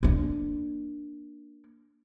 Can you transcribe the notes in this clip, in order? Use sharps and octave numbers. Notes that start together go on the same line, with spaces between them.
A#3 D4